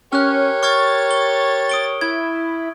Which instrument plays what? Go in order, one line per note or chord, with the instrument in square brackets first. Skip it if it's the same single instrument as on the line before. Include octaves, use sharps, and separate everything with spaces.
[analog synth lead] C#4 [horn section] G4 A#4 C#5 [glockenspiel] F6 F#6
[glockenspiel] C#6 F6 G#6 [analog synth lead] A6
[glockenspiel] G7
D#6 D7 G7
[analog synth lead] E4 [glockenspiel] G#6